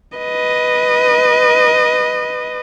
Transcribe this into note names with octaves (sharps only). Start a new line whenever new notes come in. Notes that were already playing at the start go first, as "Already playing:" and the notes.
B4 D#5